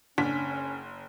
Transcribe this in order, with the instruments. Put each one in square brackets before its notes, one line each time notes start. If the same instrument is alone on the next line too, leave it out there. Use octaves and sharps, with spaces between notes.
[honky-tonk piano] F#1 B6 [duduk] C#4 [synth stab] D4